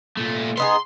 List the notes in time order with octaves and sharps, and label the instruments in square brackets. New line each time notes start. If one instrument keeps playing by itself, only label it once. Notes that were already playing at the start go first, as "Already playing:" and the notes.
[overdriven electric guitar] A#2 A3
[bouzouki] B3 D#4 G#4 [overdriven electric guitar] C6